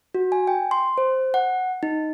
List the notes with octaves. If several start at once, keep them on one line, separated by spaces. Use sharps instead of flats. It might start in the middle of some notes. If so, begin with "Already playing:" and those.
F#4
G#5
G5
C6
C5
F#5
D#4